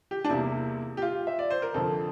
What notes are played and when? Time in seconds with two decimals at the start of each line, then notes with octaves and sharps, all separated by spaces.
0.11 G4
0.25 D4
0.29 E2 C3 G3 A#3 E4
0.97 G4
1.02 F4
1.27 E5
1.39 D5
1.50 C5
1.62 A#4
1.74 F2 D3 F3 A4